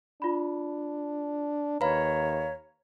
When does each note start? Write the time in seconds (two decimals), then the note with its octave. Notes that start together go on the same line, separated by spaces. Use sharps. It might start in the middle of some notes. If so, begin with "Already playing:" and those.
0.22 D4 F4 B5
1.81 D#2 B4 C#5 F5 A#5 B5